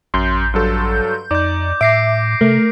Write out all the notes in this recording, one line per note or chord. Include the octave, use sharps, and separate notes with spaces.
A1 F#2 C6 G6
G2 F#3 A4
F2 D#4 D5 D6 G6
A2 E5 D6 A#6 C7 D7
C3 A3 A#4